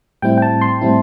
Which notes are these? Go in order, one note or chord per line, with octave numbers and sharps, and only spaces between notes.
A2 G3 C4 E4 G5
G5
A5
C6
A2 G3 C4 E4